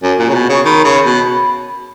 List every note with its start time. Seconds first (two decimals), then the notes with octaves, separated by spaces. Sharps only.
0.03 F#2 G#5
0.19 A#2
0.29 C#3
0.34 B2
0.49 C#3 C#6
0.65 D#3 B5
0.85 C#3
1.05 B2